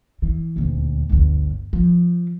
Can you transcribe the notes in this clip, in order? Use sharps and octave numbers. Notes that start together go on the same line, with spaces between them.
E3
D#1 D2
G1 D2
F3